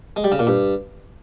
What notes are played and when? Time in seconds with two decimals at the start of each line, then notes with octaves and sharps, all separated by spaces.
0.16 G#3
0.24 G3
0.32 C#3
0.39 A#2
0.47 G2